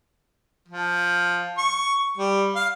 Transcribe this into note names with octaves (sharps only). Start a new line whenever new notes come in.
F3
C#6
G3
F5